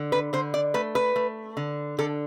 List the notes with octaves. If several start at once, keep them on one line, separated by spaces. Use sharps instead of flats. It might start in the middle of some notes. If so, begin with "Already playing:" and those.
Already playing: D3
B4
D3 C5
D5
A3 B4
B4
A3
D3
D3 A4